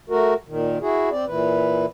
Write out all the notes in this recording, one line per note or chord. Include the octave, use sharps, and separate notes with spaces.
A3 F#4 A#4
A#2 D#3
E4 F#4 G#4
C4 D5
A#2 E3 B4